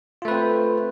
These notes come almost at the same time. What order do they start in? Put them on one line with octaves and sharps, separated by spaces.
F4 A3 B4 C4 C5